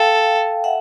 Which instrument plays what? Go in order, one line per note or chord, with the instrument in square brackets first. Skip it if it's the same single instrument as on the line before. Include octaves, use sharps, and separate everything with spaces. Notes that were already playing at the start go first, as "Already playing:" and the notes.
Already playing: [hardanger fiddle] A4 [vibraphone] F5 G5
[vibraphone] E5 F#5